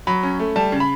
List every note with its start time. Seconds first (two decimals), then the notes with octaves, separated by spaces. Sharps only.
0.07 F#3 B5
0.23 C#4
0.39 A3
0.56 G3 A5
0.72 C#3
0.80 B5